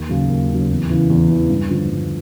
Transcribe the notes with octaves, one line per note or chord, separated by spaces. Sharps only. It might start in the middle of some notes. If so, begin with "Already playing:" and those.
Already playing: D#2
C#3 F#3
D#2
C#3 F#3
E2
C#3 E3
E2
C#3 E3
G2
D3 F3
G2